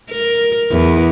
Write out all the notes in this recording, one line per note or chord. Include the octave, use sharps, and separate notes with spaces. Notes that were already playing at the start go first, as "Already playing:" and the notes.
A#4
E2